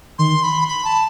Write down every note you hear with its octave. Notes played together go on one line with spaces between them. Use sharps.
D#3 C6
B5
B5
A5